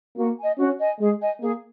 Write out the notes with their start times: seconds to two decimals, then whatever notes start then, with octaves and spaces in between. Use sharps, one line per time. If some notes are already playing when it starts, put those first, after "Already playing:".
0.17 A#3 F#4
0.38 D#5 G#5
0.58 C#4 F#4
0.79 D#5 G#5
0.99 G#3 G#4
1.20 D#5 G#5
1.40 A#3 G#4